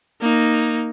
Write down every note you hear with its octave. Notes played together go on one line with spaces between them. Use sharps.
A#3 D#4